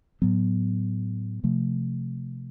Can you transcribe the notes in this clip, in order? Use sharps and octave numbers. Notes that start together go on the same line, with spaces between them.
A2 F#3 B3
C3 F3 A3